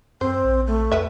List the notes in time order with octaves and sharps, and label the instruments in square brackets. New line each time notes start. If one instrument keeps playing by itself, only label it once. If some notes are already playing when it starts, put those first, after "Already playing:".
[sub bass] F#2 [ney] C4 [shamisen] C5
[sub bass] A#1
[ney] A3
[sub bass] F2 [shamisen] A4 B4 E5